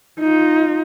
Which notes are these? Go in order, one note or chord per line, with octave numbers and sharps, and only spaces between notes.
D#4 F4